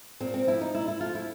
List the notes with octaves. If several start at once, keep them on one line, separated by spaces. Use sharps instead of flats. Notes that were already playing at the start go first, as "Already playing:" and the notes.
A#2 C4
C4
F3 A3 E4
D#4
A#2 E4
E4
F3 A3 F4
E4